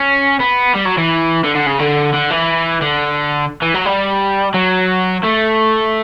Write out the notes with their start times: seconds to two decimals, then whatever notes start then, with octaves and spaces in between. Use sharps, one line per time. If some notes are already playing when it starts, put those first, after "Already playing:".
Already playing: C#4
0.40 B3
0.75 G3
0.86 F#3
0.98 E3
1.44 D3
1.55 D3
1.67 C#3
1.79 D3
2.13 D3
2.30 E3
2.82 D3
3.62 E3
3.74 F#3
3.86 G3
4.54 F#3
5.24 A3